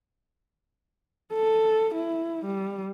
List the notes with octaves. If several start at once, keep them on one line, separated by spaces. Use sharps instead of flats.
A4
E4
G3